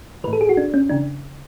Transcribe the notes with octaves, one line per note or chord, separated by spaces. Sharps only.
A2 E3 B4
A4
G#4
F#4
D4
C#4
C#3 E3 D4